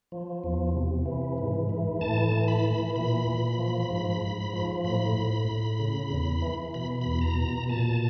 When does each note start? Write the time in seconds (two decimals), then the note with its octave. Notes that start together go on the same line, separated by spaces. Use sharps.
0.12 F3
0.44 E2
0.74 C3
1.06 E3
1.38 G#2
1.69 E3
2.01 A2 A5
2.32 E3
2.48 B5
2.65 E3
2.96 A#2 B5
3.27 A#2
3.59 F3
3.90 G#2
4.22 G#2
4.53 F3
4.84 A2 B5
5.16 A2
5.49 A2
5.79 C#3
6.11 E2
6.42 E3
6.74 B2 B5
7.01 E2 B5
7.21 A#5
7.37 B2
7.68 A#2 A5